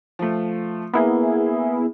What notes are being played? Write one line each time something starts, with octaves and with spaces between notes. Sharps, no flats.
F3 A3
A#3 B3 E4 G#4